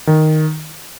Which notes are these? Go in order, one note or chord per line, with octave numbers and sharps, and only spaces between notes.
D#3